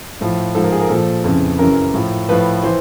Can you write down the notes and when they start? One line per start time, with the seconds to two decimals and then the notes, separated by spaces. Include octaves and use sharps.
0.21 A2 F3
0.55 G#2 F3 A4
0.64 A#4
0.72 G#4
0.81 A#4
0.89 A#2 F3 A4
1.24 F2 C#3 E3
1.59 F#2 C#3 E3 A#4
1.94 A2 F3
2.29 A2 F3 B4
2.63 E3 C5